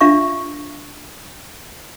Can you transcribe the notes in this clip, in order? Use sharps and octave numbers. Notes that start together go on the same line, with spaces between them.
D4 F4 E5 F5 C#6